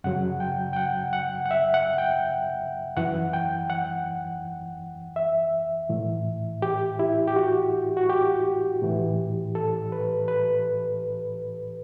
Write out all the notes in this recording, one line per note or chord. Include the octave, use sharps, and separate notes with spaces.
F#2 C#3 F#3 F#5
G5
G5
F#5
F#5
F#5
E5
F#5
G5
F#2 E3 F#5
G5
F#5
E5
A2 E3
G4
E4
G4
F#4
F#4
G4
A2 E3
A4
B4
B4